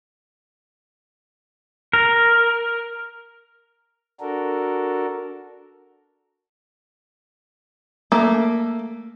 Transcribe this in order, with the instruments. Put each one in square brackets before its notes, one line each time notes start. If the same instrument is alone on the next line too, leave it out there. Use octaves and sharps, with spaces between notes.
[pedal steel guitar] A#4
[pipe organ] D4 F#4 A4 A#4
[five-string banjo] A3 A#3